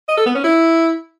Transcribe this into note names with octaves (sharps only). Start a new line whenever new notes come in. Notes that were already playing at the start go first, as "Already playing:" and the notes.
D#5
A4
B3
C#4
E4